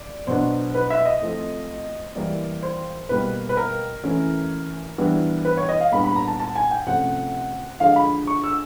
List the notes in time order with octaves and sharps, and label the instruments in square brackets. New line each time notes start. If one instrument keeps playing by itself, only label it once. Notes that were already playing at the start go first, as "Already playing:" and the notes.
Already playing: [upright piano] D5
B2 F#3 B3 D4 C5
B4
E5
D#5
F3 A3 C4
E3 G3 A#3 D5
C5
B2 G3 A#3 B4
B4
A#4
E3 A3 C#4
E3 G3 B3 D4
B4
C#5
D#5
F5
A#2 G3 B3 D4 B5
B5
A#5
A5
A5
G#5
G5
C3 F3 A3 C#4 F#5
D3 F3 G#3 F5
B5
C#6
E6